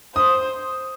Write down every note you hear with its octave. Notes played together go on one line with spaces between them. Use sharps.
C5 D#6